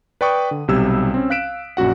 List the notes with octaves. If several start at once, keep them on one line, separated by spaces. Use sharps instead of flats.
B4 D5 G5 C#6 D#6
D3
B1 C3 G3 E6 G#6
C4 C#4
F5 F#6 B6 D7 E7
A#1 F#2 F#4 F#5